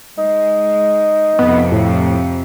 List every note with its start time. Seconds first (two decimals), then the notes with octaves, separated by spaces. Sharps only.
0.18 G#3 D#4
1.39 F2 C3 B3
1.72 A2